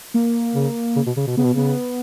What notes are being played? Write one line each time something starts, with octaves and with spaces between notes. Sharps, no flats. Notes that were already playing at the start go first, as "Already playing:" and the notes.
A#3
C#3
C#3
B2
C#3
B2
C#3 B3
B2
C#3 B3